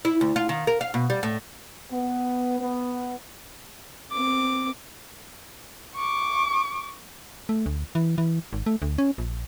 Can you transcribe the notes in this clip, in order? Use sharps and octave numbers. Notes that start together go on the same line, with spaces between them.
E4
D2
F4
D#3
A#4
F5
B2
G3
A2
B3
B3
C4 D6
C#6 D6
A3
D2
E3
E3
G#1
A3
D2
C#4
A#1